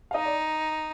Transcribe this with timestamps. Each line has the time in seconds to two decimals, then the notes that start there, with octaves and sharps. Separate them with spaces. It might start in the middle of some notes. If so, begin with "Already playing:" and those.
0.11 F5
0.14 D#4 D#5
0.26 D5